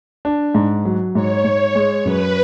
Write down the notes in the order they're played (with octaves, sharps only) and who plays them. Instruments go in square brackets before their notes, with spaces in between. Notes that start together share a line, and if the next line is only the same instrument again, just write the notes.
[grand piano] D4
G#2
F#3
[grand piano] G#2 [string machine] C#5
[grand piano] G#2
G#3
[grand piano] F#2 [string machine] B4